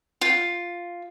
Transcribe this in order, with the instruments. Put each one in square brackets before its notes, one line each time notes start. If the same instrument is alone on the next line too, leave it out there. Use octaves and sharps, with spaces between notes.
[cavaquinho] F4